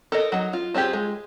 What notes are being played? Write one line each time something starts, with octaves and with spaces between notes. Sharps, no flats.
A4 A#4 D#5
F#3 D#4
F4
C4 D4 F4 G4 G#4
G#3